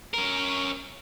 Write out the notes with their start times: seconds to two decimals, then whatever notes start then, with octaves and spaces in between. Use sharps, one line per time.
0.14 C#4 A#4